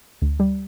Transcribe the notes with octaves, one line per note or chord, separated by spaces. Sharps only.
D2
G3